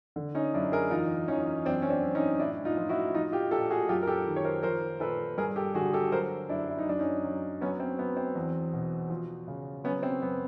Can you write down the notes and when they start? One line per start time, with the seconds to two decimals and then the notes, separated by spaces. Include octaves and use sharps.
0.16 D3
0.35 C#4 D#4
0.54 F#2 D4 E4
0.72 G#4 A#4
0.90 E2 D#4 F4
1.28 E2 C#4 D#4
1.65 F#2 C4 D4
1.82 C#4
1.90 C4 D4
2.03 F#2
2.15 C#4 D#4
2.40 A2 D4 E4
2.65 D#4 F4
2.77 F3
2.89 E4 F#4
3.14 F3 D#4 F4
3.32 F4 G4
3.51 A#2 G4 A4
3.70 F#4 G#4
3.88 F#2 F4 G4
4.03 A#4
4.07 G4 A4
4.26 D#3
4.36 C#5
4.45 A#4 C5
4.63 F3 A#4 C5
5.00 A#2 A4 B4
5.38 G2 G#4 A#4
5.56 G4 A4
5.74 D3 F#4 G#4
5.93 G4 A4
6.12 F#3 A#4 C5
6.49 F#2 D4 E4
6.69 E4
6.78 D#4
6.86 F#2 D4
6.99 C#4 D#4
7.25 F#3
7.61 F#3 B3 C#4
7.80 C4
7.99 F#3 B3
8.17 C4
8.35 E2
8.73 B2
9.10 F3
9.48 C#3
9.84 F#3 B3 C#4
10.03 C4
10.21 F#2 B3